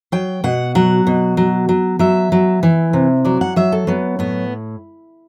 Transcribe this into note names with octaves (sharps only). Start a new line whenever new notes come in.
F#3 G5
B2 F#5
F#3 F#5
B2
F#3
F#3
F#3 E5
F#3
E3
C3
F#3 D5
F#5
F#3 E5
A4
F#3 B3
A2 B3